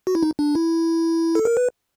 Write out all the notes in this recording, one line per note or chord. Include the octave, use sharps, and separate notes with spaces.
F#4
E4
D#4
D4
E4
A4
A#4
B4